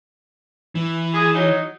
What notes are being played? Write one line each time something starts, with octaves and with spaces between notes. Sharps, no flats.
E3
G#4
F#3 D#4